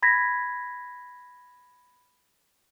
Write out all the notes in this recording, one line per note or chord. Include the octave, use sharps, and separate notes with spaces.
B5 G#6 A#6 B6